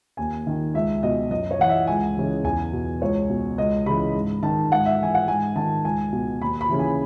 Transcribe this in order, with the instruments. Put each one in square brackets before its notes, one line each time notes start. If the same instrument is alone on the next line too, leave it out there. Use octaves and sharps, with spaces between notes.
[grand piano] D#2 G#5
D#3
C#2 E5
B2 D#5
F#2 D#5
C#5
E3 F#5
E5
C#2 G#5
C#3 E3
E2 G#5
B2
C#2 C#5
B2
C#2 D#5
C#3 E3 B5
G#2
D#3 A5
G#2 F#5
E5
E3 G#5
F#5
G#2 G#5
D#3 A5
C#2 G#5
B2
D#2 B5
B5
C#3 E3
G#5